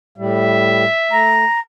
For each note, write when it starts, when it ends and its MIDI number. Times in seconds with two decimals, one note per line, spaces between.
0.18 0.84 45
0.18 0.84 55
0.18 1.40 76
1.11 1.45 57
1.11 1.59 82